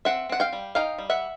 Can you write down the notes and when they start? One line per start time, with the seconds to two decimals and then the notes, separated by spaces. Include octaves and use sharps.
0.05 C4 E5 F#5
0.29 C4 F#5
0.40 F5 G5
0.53 G3
0.75 D#4 F5 G5
0.98 G3
1.10 E5 F#5